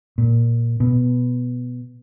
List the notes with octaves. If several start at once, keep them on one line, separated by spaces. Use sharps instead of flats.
A#2
B2